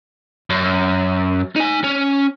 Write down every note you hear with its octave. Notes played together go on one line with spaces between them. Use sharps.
F#2
D#4 G#5
C#4